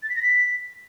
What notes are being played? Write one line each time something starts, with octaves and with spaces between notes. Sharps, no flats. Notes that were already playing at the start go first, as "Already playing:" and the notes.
A6
B6
A#6
B6